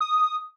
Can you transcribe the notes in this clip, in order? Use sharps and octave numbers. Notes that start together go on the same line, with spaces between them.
D#6